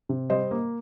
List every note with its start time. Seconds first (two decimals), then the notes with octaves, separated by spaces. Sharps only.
0.09 C3
0.30 G3 C5 D#5
0.51 A#3